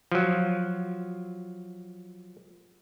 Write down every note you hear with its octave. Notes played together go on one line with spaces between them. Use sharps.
F3 F#3